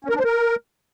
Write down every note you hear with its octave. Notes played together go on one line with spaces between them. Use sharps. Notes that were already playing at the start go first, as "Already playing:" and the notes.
C#4
A#4
D4
C5
A#4